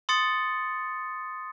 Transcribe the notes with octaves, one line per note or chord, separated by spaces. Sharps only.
C6 D#6 A6 C#7